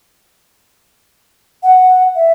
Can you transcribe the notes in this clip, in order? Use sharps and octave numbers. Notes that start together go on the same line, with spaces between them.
F#5
E5